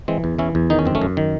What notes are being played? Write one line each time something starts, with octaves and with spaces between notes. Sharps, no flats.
E3 G#3 C4
E2
E3 C#4 E4
E2
D#3 D#4
C#4
F#2 C4
A3 C#4
F#2
D#3